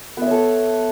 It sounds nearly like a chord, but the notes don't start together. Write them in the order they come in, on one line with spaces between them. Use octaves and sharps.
B3 E5 C#5 A4